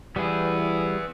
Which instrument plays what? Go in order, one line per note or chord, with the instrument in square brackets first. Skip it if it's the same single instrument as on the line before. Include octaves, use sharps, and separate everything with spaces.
[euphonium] E3 [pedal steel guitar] G3 G#4 [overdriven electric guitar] B3 E4